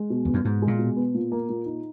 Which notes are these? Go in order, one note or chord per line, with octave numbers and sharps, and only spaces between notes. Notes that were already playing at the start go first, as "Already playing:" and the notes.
Already playing: G#3
B2
E2 B3
F#2
G#2 B2
G#3
A#2
B2
B3
A#2
A#3
A#2
D#4